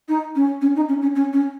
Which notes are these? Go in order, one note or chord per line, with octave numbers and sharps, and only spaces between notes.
D#4
C#4
C#4
D#4
C#4
C#4
C#4
C#4